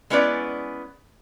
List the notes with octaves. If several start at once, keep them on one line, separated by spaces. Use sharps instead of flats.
G#3 B3 C#4 E4 B4 D5